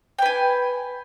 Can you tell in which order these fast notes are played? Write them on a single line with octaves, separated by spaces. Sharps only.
G5 B4 G#5